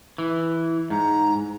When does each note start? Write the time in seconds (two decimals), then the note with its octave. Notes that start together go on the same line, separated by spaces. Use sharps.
0.18 E3
0.90 G#2 A#5